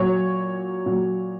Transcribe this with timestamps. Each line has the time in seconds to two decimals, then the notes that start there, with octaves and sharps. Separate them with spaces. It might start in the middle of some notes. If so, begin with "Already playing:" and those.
Already playing: A#2 F#3 C#5
0.86 A#2 F#3